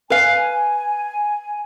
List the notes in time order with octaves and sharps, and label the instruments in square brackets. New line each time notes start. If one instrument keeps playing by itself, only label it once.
[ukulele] B4 F5 [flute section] G#5